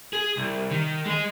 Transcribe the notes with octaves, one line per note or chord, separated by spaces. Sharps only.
G#4
C2
D#3
G#3 D#5